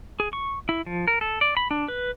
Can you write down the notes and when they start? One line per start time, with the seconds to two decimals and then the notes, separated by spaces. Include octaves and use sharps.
0.20 G#4
0.33 C#6
0.69 E4
0.86 F3
1.08 A#4
1.21 A4
1.41 D5
1.57 B5
1.71 D4
1.88 B4